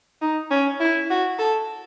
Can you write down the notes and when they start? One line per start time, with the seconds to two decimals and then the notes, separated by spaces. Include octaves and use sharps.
0.22 D#4
0.51 C#4
0.80 E4
1.10 F#4
1.39 A4